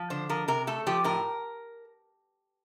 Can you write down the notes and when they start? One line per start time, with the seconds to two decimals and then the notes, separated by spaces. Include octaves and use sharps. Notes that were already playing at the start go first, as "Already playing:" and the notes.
Already playing: F3
0.10 D3 C5
0.29 F3 A#4
0.48 C3 A#4
0.67 A3 A4
0.87 F3 G4
1.04 A2 A#4